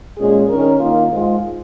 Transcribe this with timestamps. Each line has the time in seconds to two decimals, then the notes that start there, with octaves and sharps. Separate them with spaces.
0.18 A#2 G#3 C#4 G#4
0.50 D#3 C#4 A#4
0.80 D#3 A#3 F4
1.11 G#2 G#3 F4